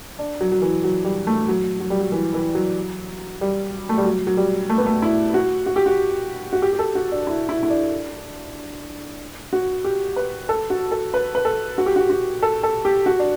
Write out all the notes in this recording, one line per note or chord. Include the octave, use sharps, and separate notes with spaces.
D4
F#3
F#3
E3
F#3
G3
A3
F#3
F#3
G3
F#3
E3
E3
F#3
G3
A3
G3
F#3
F#3
G3
A3
B3
A3
E4
F#4
F#4
G4
F#4
F#4
G4
G4
A4
F#4
D4
E4
E4
E4
D4
F#4
G4
B4
A4
F#4
A4
B4
B4
A4
F#4
G4
F#4
F#4
A4
A4
G4
F#4
D4